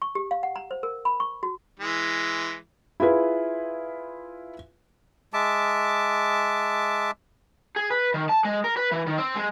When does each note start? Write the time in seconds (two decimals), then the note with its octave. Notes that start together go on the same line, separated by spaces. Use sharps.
0.02 C#6
0.15 G4
0.31 F5
0.43 F#5
0.56 A#5
0.71 C5
0.83 A#4
1.05 B5
1.20 C#6
1.43 F#4
1.80 E3 G#3
3.00 E4 F4 G#4 B4
5.33 G#3 E5 A5 D6
7.76 G#4
7.90 B4
8.14 D#3
8.29 A5
8.45 G#3
8.64 A#4
8.77 B4
8.92 E3
9.07 D#3
9.19 C4
9.36 G#3